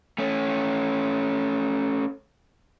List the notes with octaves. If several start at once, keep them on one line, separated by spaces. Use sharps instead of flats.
A3 C#4